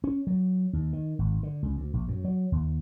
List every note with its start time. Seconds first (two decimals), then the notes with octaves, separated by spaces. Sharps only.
0.04 C#4
0.27 F#3
0.73 D#2
0.93 D#3
1.19 G#1
1.43 D3
1.63 C#2
1.77 D2
1.93 A#1
2.08 F#2
2.24 F#3
2.52 D#2